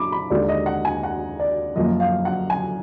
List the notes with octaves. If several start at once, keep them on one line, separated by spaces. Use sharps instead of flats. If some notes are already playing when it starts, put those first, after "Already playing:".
Already playing: F#2 D3 B5 D6
B5
D#2 D3 G#3 D5
D#5
F#5
G#5
F#5
D5
F#2 F3 A#3 D#5
F5
F#5
G#5